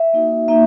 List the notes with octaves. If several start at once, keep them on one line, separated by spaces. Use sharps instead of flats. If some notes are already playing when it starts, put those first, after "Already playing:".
Already playing: E5
A#3 D#4 F#4
A#3 D#4 E5